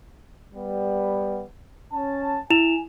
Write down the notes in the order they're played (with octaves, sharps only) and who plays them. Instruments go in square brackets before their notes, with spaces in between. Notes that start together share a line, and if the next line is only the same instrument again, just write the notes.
[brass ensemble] G3 B3
C#4 A5
[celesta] E4 E7 F7 [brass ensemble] G#5